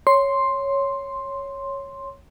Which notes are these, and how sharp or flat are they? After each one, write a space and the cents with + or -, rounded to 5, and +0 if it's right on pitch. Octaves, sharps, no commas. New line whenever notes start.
C#5 +0 C6 +5